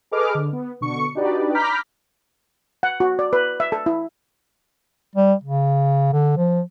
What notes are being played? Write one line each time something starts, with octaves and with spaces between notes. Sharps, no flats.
G#4 A4 B4 D#5 D6 F6
D3
B3
B2 D3 C#6 C#7
D4 D#4 F#4 G4 B4 D5
A#5 B5 D6 F6 G6 B6
F#5
F#4
D5
B4
E5
A4
E4
G3
C#3
D3
F3